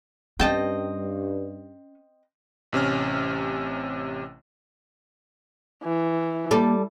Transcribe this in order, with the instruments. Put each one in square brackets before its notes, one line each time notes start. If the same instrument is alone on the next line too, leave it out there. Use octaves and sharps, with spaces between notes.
[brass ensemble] G2 [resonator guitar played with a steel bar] C4 D#5 [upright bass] C#4 [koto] G5 A5
[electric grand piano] A1 C3 C#4 F6
[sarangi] E3
[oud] G3 A4 [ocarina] A#3